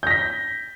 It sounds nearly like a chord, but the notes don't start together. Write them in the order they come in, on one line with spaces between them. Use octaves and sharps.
G6 A#6 B6